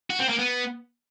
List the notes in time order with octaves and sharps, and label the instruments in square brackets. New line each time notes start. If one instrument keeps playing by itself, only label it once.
[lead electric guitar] F#4
C4
A#3
B3